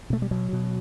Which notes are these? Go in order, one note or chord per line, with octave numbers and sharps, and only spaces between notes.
B2 A3
G3
B2 F#3
B2